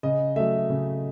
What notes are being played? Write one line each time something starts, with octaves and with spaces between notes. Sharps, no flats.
C#3 D#5
F#3 A3 E5
C#3